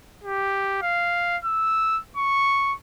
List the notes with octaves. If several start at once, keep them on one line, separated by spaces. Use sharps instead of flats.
G4
F5
E6
C#6